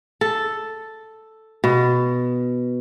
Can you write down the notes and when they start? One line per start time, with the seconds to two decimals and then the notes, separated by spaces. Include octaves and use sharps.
0.21 A4
1.64 B2